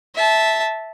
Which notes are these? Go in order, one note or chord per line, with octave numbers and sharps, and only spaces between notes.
E5 A5